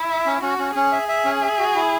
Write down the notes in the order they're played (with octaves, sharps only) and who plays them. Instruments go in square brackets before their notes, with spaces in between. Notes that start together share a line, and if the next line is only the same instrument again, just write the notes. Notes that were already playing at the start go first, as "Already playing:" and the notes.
Already playing: [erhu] E4
[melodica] E5
C#4
[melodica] C#4 [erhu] F#4
[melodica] C#4
[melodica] C#4 [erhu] G#4
[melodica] E5
E5
C#4
E5
F#4
E4